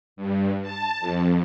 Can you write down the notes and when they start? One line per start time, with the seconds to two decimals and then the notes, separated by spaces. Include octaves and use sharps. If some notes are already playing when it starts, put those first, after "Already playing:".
0.16 G2
0.62 A5
1.00 F2